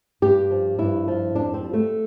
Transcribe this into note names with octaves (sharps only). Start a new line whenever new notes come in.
G2 G4
F3
G2 E4
F3
F2 D4
C4
G3
A3